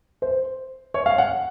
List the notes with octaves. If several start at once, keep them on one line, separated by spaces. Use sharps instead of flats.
C5
C#5
F5
F#5